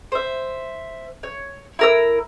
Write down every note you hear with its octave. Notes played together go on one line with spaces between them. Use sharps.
C5 E5
C#5
E4 A#4 E6